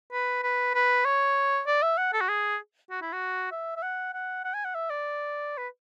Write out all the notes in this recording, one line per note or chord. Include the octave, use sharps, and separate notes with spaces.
B4
B4
B4
C#5
D5
E5
F#5
A4
F#4
G#4
F#4
E4
F#4
E5
E5
F#5
F#5
F#5
G#5
F#5
E5
D5
B4